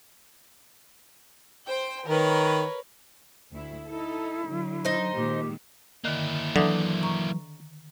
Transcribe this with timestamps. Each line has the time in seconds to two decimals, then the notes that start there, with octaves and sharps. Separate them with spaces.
1.67 C5 G5 G6
2.07 D#3 A#4 B4 C#5
3.52 D2 E4
3.88 D#4 E4 A4
4.47 D3 F#3
4.85 D#4 C5
5.13 A#2 D#3 G#3 G4
6.05 D3 D#3 A#3 E4
6.56 D3 E3 F#3 E5 D6 D#6
7.03 A#5 C#6